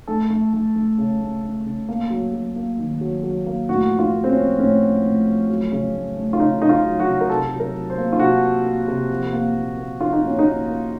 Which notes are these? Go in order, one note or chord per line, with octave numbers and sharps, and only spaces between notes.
A3 A4
A3
A3
A3
C#3
A3
A3
C#3
A#3
F#3
F#3
A#3
D#3
F#3
F#3
A#3
A2 F#4
F3
F4
A#3
C4
C#4
F3
A2 C#4
F3
A2
F3
F#3
C#3
A3
A3
F4
C#3 D#4
C#3 D#4
F4
F#3
F#4
C#3
A#4
C3 A4
F#3
A#4
F#3
C5
A#3
F4
C3 F#4
A#3
A#3
C3
F3
A#3
A#2
A#3
F3 F4
D#4
A#2 C#4
D#4
A#2
A#3